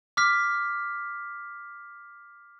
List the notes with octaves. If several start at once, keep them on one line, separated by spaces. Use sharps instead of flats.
D6 F6 B6